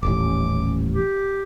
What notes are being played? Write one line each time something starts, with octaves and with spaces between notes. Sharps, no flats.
D#1 A1 D6
G4